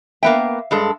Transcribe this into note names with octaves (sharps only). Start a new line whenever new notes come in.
A#3 B3 E5 F5 G5
G2 G#3 A4